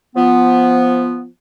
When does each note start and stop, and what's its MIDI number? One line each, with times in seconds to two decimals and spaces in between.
0.16 1.26 53
0.16 1.26 59